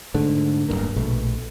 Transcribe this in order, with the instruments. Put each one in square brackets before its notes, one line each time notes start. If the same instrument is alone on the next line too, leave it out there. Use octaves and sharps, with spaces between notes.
[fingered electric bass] G#2 D3 A3
D1 C2 G2 A#3
A#1 B2 A3